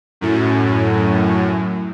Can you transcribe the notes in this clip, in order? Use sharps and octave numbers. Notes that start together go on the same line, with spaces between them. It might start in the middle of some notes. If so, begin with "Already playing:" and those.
F#2 A2